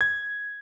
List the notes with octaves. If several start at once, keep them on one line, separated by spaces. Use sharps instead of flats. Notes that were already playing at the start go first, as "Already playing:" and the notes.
G#6